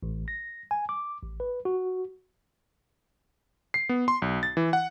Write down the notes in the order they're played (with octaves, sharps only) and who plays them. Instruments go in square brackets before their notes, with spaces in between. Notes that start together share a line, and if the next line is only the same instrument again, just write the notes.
[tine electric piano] A1
A#6
G#5
D6
A1
B4
F#4
[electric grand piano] C7
B3
C6
B1
A6
E3
F#5